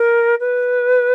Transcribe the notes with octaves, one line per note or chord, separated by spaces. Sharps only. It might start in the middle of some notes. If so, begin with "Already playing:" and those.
Already playing: A#4
B4